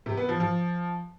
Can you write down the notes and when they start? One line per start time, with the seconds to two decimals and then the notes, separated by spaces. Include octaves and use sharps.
0.06 C3
0.17 B3
0.29 F3
0.40 F3